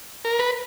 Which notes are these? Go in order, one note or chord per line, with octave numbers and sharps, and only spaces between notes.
A#4
B4